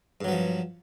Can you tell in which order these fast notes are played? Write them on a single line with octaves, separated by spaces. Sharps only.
G2 F#3 B3 F3